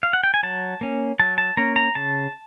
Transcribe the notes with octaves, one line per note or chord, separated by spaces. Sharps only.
F5
F#5
G5
G#5
F#3 A5
A#3 C#4
F#3 A5
A5
A#3 C#4 A#5
A#5
C#3 A5